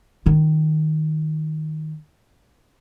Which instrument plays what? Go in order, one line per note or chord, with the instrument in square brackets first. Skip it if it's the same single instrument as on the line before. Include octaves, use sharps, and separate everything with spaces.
[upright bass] D#3 F4